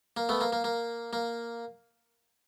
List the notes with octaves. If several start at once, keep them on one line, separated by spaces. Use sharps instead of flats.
A#3
A3 B3
A#3
A#3
A#3
A#3